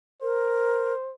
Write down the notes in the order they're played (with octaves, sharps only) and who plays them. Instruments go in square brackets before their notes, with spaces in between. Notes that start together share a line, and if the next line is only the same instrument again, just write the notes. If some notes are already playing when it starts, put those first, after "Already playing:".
[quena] A#4 [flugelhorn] C5